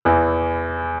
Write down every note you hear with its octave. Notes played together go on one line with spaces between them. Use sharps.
E2 E3